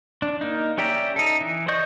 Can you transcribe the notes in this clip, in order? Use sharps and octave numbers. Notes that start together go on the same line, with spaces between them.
D4
A#3 D#4
C#4 G4 D5 E5 A#5
D#4 A4
E3
C5 D5 D#5 C#6 G6